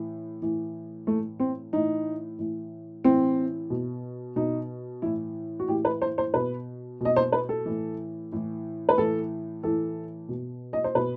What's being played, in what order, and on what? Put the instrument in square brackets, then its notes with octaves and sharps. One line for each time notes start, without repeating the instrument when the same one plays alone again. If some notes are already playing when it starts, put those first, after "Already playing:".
Already playing: [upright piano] A2 E3
A2 E3
A2 E3 A3
C4
A2 E3 D#4
A2 E3
A2 E3 C4
B2
B2 D#4
A2 E3 E4
F#4
A2 E3 G4
B4
C5
C5
B2 B4
B2 D#5
C5
B4
A4
A2 E3
A2 E3
B4
A2 E3 A4
A2 E3 A4
B2
D#5
C5
B2 B4